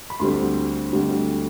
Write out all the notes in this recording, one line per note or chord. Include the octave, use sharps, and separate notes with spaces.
B5
D2 D3 G3 C4 C6
D2 D3 G3 C4